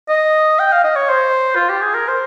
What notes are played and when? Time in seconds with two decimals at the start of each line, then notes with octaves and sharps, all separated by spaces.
0.09 D#5
0.59 G5
0.72 F5
0.84 D#5
0.96 C#5
1.09 C5
1.56 F4
1.69 G4
1.82 G#4
1.94 A#4
2.08 C5